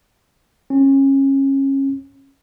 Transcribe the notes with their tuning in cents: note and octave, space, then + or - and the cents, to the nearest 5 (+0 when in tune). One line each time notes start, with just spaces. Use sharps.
C#4 -25